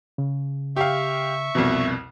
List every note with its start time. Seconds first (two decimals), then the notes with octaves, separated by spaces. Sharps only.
0.18 C#3
0.76 G4 E5 F5 C#6
1.55 C2 F2 B2